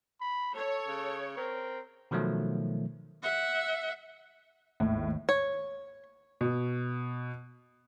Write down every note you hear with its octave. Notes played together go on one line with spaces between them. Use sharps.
B5
A4 C#5
C#3
C4 A#4
B2 D#3 F3 F#3 A3
E5 F#5
G#1 D#2 A2
C#5
B2